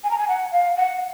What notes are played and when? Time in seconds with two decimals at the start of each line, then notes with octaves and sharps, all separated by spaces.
0.04 G#5
0.11 A#5
0.18 G#5
0.28 F#5
0.52 F5
0.76 F#5